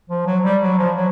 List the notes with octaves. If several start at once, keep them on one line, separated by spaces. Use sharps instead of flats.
F3
F#3
G3
F#3
F3
F#3